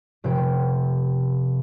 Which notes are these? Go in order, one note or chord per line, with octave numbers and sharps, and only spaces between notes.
F1 C3 C#4 G5 D7